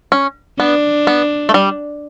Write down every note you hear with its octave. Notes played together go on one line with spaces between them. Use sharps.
C#4
B3 D4
B3
A3
G3